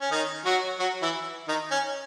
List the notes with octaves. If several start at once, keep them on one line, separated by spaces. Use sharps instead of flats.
C#4
D#3 D#4
F#3 F#4
F#3 F#4
E3 E4
D#3 D#4
C#4